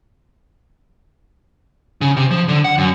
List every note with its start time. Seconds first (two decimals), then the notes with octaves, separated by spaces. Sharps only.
2.01 C#3
2.17 C3
2.31 F3
2.48 D3
2.64 F#5
2.78 F#2